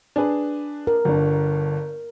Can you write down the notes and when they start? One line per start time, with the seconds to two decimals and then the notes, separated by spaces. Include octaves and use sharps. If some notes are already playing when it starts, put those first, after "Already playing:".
0.16 D4 G#4 B4
0.87 A#4
1.05 G1 G2